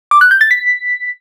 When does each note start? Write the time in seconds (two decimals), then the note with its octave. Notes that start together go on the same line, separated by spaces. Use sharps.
0.11 D6
0.21 F#6
0.31 G6
0.41 A6
0.51 B6